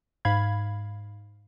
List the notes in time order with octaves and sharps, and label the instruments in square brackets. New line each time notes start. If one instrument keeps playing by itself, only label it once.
[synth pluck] G#2 F5 B5 G#6